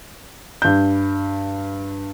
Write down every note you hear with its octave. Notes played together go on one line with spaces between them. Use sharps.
G2 G6